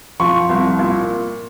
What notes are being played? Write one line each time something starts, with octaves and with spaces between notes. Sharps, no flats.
F3 C#6
C2
A#2